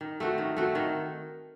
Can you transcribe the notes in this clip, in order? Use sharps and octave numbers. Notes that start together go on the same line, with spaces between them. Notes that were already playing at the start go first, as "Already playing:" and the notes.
D#3
A3 C4 F#4
D#3
A3 C4 F#4
D#3